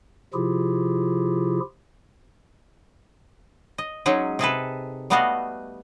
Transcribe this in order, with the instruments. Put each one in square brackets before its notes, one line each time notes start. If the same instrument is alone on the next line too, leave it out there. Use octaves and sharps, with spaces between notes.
[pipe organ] C3 F3 E4 F4 G4 G#4
[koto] D#5
F#3 G#3 C#4 D#4 G#4
C3 G#4 A4 B4
G3 A3 B3 F#4 D#5 F5